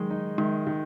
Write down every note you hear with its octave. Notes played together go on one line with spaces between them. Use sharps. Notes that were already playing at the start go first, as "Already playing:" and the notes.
Already playing: D#3 F#3 G#3
D#4
D#3 G#3
D#3